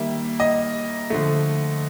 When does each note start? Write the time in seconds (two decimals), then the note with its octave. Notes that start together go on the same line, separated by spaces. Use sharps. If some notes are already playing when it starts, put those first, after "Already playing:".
Already playing: D#3 G3 A#3 E5
0.40 D#5
1.10 D3 F3 A3